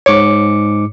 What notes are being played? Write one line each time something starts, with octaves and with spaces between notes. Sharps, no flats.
G#2 C#5 D6 C#7